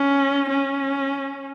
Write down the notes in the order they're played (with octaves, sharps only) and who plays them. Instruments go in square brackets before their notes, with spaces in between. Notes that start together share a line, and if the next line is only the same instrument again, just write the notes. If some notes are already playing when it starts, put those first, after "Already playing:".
Already playing: [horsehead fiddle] C#4
C#4